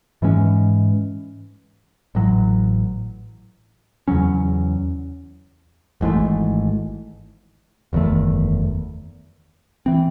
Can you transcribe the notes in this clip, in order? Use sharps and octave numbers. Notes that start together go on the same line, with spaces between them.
G#2 E3 G#3 C#4
A1 A2 F#3
E2 C#3 F#3 C#4
G#1 G#2 E3 A3
F#1 E2 D#3 A3
E3 C4